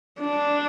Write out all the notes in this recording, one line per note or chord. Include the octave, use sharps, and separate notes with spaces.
D4